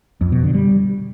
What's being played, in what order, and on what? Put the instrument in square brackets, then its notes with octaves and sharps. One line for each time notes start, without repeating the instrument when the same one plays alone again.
[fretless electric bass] F2
B2
D3
G3